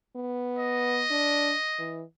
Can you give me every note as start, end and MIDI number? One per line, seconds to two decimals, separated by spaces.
0.16 1.05 59
0.58 2.04 75
1.10 1.53 62
1.79 2.03 52